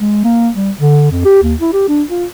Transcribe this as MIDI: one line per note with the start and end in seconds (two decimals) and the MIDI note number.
0.01 0.22 56
0.24 0.49 58
0.55 0.71 55
0.79 1.06 50
1.11 1.25 41
1.25 1.43 67
1.43 1.54 39
1.61 1.73 64
1.73 1.85 67
1.88 2.03 62
2.09 2.25 65